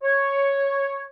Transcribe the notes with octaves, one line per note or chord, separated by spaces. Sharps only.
C#5